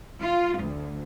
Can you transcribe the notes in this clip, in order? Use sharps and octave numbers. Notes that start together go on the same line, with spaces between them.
F4
D2